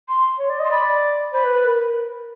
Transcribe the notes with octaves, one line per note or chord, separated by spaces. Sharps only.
C6
C#5
D5
D#5
C6
D5 B5
C5 B5
B4
B4
A#4